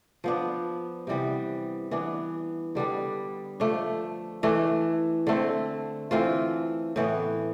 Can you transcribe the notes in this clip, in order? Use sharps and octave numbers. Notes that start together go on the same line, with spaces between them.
F3 B3 D4
C3 E3 G3 B3
E3 B3 D4
D3 G3 B3 D4
F3 A3 D4
E3 A3 D4
D3 A3 C4
E3 A3 C4 F4
A2 E3 B3